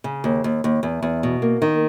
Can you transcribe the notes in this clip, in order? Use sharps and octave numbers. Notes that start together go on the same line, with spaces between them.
C#3
D#2
D#2
D#2
E2
E2
B2
A#3
D#3